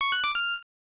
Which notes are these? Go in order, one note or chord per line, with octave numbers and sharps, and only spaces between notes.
C#6
F#6
D6
F6